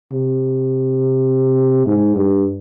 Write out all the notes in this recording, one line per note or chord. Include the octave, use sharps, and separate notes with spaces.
C3
G#2
G2